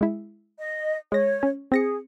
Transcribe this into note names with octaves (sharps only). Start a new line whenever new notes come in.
G#3 E4
D#5
G#3 C#5 A#6
C#4
C4 G#4 A#6 C#7